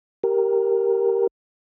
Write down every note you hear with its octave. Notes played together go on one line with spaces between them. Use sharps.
G4 A#4